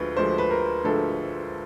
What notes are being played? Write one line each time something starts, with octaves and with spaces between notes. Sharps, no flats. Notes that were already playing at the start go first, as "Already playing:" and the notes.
Already playing: D2 D3 F3 G#3 B4
D2 D3 F3 G#3 C5
B4
A#4
D2 D3 F3 G#3 A4